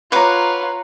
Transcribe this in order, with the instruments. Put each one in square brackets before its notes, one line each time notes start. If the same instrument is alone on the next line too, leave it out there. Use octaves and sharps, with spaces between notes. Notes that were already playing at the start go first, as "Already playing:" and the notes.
[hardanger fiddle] F4 C#5 [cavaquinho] B4 D6 [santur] F#5 A#5